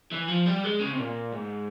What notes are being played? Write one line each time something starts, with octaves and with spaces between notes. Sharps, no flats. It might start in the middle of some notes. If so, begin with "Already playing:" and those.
E3
F3
G3
G#3
C#3
C3
A#2
G#2